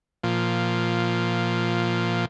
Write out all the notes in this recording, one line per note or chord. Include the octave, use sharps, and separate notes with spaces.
A#2 F3